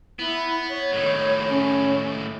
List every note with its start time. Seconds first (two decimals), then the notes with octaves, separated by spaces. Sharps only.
0.19 B3 E4
0.69 C#5
0.92 A2 D#3
1.49 C#4